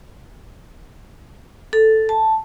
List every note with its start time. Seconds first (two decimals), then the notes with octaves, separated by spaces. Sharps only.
1.73 A4
2.09 A5